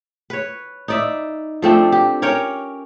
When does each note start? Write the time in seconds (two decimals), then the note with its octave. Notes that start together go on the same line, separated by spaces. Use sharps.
0.30 B4 C#5
0.88 D#4 D5 E5
1.62 F3 A3 C4 D4
1.92 G4
2.22 C#4 A#4 C#5 G5